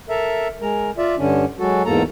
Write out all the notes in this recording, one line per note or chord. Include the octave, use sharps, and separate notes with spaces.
A4 A#4 E5
G#3 A#4
F4 D5 E5
G2 D3 C#4 D4
F#3 G#3 F#4 A4
E2 G#2 A#3 A4 A#5